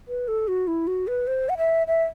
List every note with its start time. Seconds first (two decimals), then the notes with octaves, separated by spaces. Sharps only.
0.08 B4
0.28 A4
0.48 F#4
0.67 E4
0.87 F#4
1.07 B4
1.27 C5
1.49 F#5
1.58 E5
1.87 E5